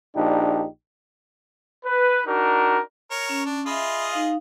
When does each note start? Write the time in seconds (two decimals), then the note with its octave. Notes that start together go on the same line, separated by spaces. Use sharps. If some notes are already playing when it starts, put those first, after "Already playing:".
0.15 A#1 D4 D#4 G4
1.85 B4
2.26 D4 D#4 F#4 A#4
3.11 A#4 C#5
3.29 C#4
3.46 D4
3.66 F4 G#4 D#5 E5 B5
4.11 D#4 F5